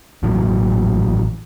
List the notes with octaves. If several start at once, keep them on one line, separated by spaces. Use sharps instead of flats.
A1 A#2 E3 F#3